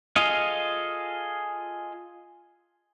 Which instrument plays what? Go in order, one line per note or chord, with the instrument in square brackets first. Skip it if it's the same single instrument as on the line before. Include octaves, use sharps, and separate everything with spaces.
[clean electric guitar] F4 G#4 A4 D#5 F5